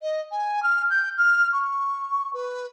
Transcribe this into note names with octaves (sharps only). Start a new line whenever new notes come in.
D#5
G#5
F6
G6
F6
C#6
B4